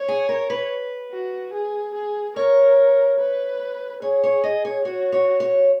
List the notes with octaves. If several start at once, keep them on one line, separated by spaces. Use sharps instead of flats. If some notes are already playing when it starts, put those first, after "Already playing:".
Already playing: C#5
G#4
A#4
B4
F#4
G#4
G#4
A#4 C#5
B4
G#4 C#5
C#5
D#5
C#5
F#4 C#5
C#5
C#5